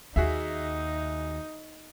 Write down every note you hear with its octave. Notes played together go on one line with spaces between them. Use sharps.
D#2 D#4 F#4 G#4 E5